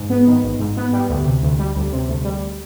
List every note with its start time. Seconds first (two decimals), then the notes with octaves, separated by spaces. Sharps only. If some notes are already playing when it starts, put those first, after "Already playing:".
Already playing: G#2
0.10 B3
0.27 D#3
0.43 G#1
0.59 G#2
0.77 B3
0.93 G3
1.09 D2
1.26 C3
1.43 D2
1.59 G3
1.76 D2
1.93 C3
2.08 D2
2.25 G3